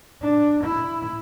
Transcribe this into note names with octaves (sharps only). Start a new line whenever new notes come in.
D4
E4